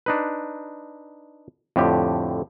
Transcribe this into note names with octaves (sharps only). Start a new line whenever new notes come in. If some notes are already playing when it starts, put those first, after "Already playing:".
D4 D#4 B4
F2 A2 D3 G4